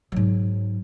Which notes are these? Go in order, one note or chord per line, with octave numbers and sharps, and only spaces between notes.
G#2 F#3